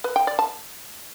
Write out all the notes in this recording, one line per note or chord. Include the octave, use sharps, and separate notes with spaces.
B4
G5
D5
A5